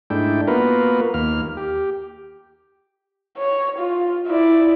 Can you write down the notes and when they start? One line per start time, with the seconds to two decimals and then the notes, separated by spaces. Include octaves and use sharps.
0.10 G#2 A3 D4 E4 G5
0.48 A#3 B3 F4 F#4 A#4 B4
1.14 D#2 A#3 F6
1.57 G4
3.38 C#5
3.79 F4
4.28 E4 D5